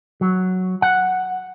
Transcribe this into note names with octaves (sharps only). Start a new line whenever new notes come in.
F#3
F#5